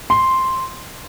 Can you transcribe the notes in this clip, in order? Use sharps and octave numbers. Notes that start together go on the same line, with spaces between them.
C6